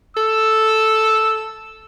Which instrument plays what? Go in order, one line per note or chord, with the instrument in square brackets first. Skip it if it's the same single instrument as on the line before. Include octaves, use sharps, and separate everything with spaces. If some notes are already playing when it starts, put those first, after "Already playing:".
[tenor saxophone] A4 [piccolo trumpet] E6